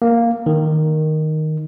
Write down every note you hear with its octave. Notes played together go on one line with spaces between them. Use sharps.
A#3
D#3